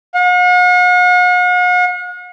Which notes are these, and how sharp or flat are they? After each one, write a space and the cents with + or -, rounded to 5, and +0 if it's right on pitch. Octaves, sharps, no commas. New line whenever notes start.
F#5 -45